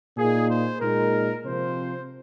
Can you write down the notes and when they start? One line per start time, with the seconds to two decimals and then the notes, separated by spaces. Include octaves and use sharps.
0.17 A#2 A#3 D#4 G#4
0.49 C5
0.81 A#2 G#3 D#4 A#4
1.45 C3 F3 C4 C5